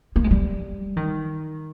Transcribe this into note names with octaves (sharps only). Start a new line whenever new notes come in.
A#3
G#3
G3
D#3